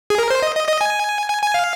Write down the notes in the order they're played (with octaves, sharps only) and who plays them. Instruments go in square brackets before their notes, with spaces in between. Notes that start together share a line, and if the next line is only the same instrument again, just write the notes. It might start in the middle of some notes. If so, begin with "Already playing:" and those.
[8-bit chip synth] G#4
A#4
C5
D#5
D#5
D#5
G#5
G#5
G#5
F5